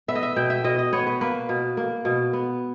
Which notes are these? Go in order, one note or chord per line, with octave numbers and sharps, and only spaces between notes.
B3 E5
D#5
E5
B2 G5
E5
B2 D#5
D#5
B3 C#5
B4
A#3 B4
B2
A#3
B2
B3